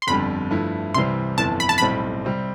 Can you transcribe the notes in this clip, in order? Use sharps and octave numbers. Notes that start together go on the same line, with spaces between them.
C6
G1 F2 D3 G3 B5
G2 F3 A3 E4
C2 C3 E3 G3 C4 C6
G1 F2 E3 A5
B5
A5
B1 A2 G3 C4 B5
C3 G3 C4